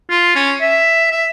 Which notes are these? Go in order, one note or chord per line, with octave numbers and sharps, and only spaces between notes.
F4
C#4
E5
E5